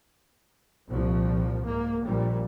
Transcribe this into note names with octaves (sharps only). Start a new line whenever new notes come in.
C2 A#2 F3
G#2 A#3
A#1 A#2 G3